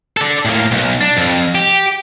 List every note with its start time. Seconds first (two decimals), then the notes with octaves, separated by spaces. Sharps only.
0.17 A4 D5
0.45 A2 A#3
0.71 B1
1.01 D4
1.17 F2
1.55 G4